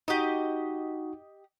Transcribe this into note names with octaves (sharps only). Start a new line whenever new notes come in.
D#4 F#4 G4 D#5